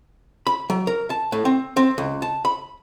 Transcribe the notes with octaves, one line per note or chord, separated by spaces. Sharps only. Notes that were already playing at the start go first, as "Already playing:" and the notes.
B5
F#3
A#4
A5
A2
C4
C4
C#2
A5
B5